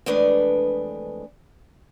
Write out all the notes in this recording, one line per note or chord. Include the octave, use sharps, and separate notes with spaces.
F2 E3 G#3 A3 D4 B4